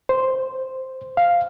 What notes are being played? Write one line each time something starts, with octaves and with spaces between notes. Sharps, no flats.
C5
F5